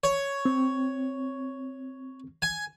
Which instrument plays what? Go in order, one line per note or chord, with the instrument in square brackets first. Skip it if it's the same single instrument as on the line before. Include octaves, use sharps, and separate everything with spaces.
[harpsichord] C#5
[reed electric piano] C4
[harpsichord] G#5